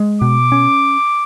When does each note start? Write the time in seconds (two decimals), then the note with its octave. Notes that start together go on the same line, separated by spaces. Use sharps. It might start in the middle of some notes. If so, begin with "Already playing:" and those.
Already playing: G#3
0.22 B2 D6
0.52 C#4